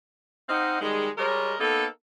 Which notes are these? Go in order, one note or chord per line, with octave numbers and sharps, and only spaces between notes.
C4 D#4 D#5 F5 F#5
D#3 G3 G#3
G3 G#3 A#4 C#5 D#5
A#3 B3 D#4 A4